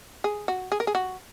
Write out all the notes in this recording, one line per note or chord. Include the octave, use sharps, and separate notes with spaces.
G#4
F#4
G#4
A#4
G#4
F#4